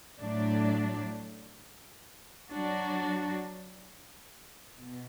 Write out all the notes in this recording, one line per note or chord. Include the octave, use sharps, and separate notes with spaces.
A2 F#3 A3 D4
F#3 D4 F#4
B2